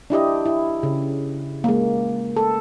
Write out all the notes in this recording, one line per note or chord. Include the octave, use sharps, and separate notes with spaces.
D4 E4 G4 D#5
E4
C#3
G#3 A#3
A4